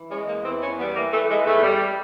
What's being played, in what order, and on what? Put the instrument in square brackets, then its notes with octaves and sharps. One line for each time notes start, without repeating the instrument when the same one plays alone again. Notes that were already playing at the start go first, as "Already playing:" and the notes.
Already playing: [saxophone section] E3
G#3 C#4
E2 A#3
E3 C4
E2 C#4
G3 B3
E3 A#3
E3 A3
E3 G#3
E2 A3
G3